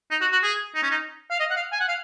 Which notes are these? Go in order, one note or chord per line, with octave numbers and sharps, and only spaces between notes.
D#4
F#4
F#4
G#4
D#4
C#4
D#4
F5
D#5
F#5
F5
G#5
F#5
F5